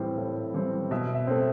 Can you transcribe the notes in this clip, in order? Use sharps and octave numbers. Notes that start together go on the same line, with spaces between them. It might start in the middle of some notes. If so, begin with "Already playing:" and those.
Already playing: A2 E3 G3 C4
A2
E3 G3 C4
B2 E5
E5
A3 C4